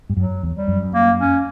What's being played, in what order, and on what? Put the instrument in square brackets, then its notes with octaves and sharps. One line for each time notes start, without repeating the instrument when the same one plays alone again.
[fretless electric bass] G2
[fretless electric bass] F#2 [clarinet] F#3
[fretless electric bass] E2
[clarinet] G3
[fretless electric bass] F#2
[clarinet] A#3
C#4